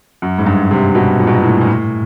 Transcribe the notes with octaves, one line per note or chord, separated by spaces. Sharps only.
F#2
G#2
G2
C3
B2
A#2
B2
A#2
A2
A#2
A2